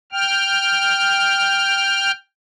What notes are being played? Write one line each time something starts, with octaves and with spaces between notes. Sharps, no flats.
G5 F6